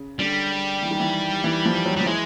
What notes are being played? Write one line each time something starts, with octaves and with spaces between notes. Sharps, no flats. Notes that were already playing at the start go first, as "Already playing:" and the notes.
Already playing: C#3
D3 G3
E3
D#3
E3
E3
F3
F#3
F3 G3
E3 G#3